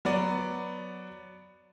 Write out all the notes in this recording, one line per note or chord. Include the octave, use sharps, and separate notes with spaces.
F#3 B3 D5